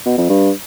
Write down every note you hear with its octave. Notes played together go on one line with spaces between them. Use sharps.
B2
F2
G2